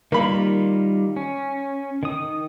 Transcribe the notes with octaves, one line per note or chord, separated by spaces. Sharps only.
D#3 G3 A#3 F4 B5
C#4
D#3 D#6